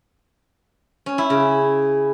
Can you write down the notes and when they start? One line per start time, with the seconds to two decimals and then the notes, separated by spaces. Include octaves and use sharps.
1.06 C#4
1.18 E4
1.30 C#3